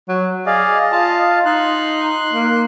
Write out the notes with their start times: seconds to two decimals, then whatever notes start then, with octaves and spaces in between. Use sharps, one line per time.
0.08 F#3
0.46 G#4 D5 D#5 F5
0.92 F4 F5 A5
1.45 D#4 C6 F#6
2.33 A#3